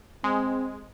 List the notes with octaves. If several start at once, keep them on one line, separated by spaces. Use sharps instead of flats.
G#3 C4